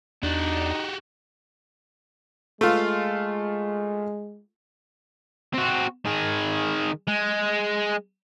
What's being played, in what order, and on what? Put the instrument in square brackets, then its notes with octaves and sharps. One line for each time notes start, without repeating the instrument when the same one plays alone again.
[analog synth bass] E2 [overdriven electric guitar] D4 [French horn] D#4 [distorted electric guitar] F#4 G4
[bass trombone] G#3 [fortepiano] A3 F4
[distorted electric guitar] C4 F#4
D#3 G#4
G#3